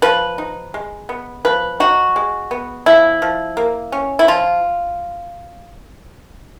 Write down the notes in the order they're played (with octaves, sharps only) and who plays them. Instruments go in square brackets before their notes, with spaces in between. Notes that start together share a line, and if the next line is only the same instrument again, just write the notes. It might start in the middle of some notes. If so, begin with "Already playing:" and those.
[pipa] F3 B4
D#4
G#3
B3
F3 B4
D#4 F#4
G#3
B3
F3 E4
F3
A#3
C#4
E4
F3 F4